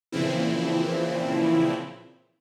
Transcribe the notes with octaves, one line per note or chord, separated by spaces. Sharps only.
A#2 C#3 E3 F3 C4 E4